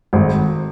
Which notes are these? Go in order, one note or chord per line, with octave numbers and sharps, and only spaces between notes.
G#1